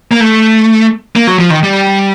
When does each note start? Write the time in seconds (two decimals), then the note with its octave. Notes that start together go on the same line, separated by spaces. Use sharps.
0.11 A#3
0.20 A3
1.16 A#3
1.27 F#3
1.39 F3
1.50 D#3
1.63 G3